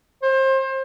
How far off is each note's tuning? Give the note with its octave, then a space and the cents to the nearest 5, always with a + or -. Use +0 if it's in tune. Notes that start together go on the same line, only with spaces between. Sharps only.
C5 +30